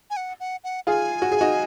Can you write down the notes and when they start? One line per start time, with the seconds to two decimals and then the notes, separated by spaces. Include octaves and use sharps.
0.10 G#5
0.17 F#5
0.40 F#5
0.64 F#5
0.87 F4 G#4 G#5
1.22 F#4
1.32 G#4
1.41 D#4 F#4